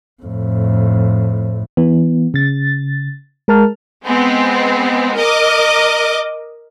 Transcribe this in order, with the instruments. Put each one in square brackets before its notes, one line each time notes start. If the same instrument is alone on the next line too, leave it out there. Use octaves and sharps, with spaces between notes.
[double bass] F2 A2
[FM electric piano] E3 B3
C#3 A6
G#3 A#4 A5 F6
[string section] G#3 B3 C4
A#4 D#5 D6